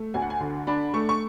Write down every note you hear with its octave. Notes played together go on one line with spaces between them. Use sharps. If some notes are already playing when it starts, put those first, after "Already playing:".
Already playing: A3
D2 G#5
F#5
G#5
D3
D4 B5
A3 C#6
C#6